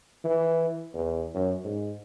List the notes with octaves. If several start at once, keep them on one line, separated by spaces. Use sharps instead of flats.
E3
E2
F#2
G#2